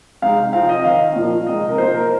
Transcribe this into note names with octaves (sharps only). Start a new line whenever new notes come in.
C3 G#3 C4 D#4 F5
F3 C4 D#4 F5
D#5
D#3 C4 D#4 F5
A#2 F3 A#3
C3 G#3 C4 D#4 D#5
A#4
F3 A#3 D#4 C5
A#4